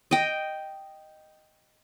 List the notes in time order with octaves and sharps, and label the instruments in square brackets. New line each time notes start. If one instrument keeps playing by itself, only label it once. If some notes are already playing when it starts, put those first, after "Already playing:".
[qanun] D#5 G5